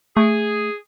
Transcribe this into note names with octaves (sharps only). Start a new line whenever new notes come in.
A3 G#4